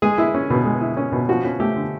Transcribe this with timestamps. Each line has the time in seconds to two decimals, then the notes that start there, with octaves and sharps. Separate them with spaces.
0.02 G#3 G#4
0.18 E4
0.34 C#4
0.50 B2
0.65 G#3
0.81 E4
0.97 C#4
1.12 B2
1.29 F3 F#4
1.44 C#4
1.60 A3 G4
1.76 D3